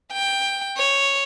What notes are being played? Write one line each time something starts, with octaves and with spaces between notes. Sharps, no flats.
G5
C#5